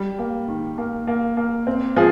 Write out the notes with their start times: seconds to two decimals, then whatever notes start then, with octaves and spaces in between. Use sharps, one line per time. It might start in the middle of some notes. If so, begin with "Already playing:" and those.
Already playing: G3
0.19 A#3
0.48 D#3
0.78 A#3
1.07 A#3
1.37 A#3
1.67 C4
1.96 F3 G#4